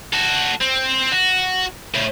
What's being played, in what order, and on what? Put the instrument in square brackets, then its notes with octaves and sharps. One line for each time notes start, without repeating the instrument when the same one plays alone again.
[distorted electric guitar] F#4 A4
C4
F#4
A2 C#3